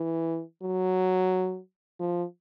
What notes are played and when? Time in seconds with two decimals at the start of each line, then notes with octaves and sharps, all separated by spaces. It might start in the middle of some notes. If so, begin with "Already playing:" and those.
Already playing: E3
0.63 F#3
1.99 F3